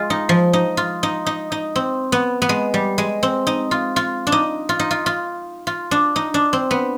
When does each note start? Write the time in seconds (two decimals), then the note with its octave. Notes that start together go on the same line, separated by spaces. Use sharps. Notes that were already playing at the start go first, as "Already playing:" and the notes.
Already playing: G#3 F4
0.10 D#4
0.29 F3
0.53 D#4
0.77 F4
1.03 D#4
1.26 D#4
1.52 D#4
1.76 C4
2.12 B3
2.42 B3
2.49 G#3
2.74 G3
2.98 G#3
3.23 C4
3.47 D#4
3.71 F4
3.96 F4
4.27 D4
4.32 D#4
4.69 F4
4.79 D#4
4.91 F4
5.06 F4
5.67 F4
5.91 D4
6.16 D#4
6.34 D4
6.53 C4
6.71 B3